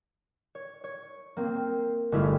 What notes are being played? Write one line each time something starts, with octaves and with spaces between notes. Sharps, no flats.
C#5
C#5
A#3 C4
G1 G#3 A3 E4 F4 D#6